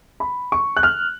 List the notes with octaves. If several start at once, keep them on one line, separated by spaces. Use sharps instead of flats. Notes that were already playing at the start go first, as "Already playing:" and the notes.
B5
C#6
F#6
F6